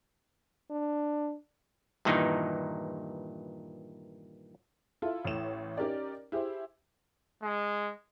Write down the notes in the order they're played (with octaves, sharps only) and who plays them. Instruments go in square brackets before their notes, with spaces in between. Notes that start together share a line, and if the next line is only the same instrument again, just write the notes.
[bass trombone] D4
[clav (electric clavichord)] G2 A#2 D#3 E3 D#4
[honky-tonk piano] E4 F4 A4
A1 A2 E7
C#4 D#4 G4 A#4 D5
E4 G4 G#4 C5
[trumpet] G#3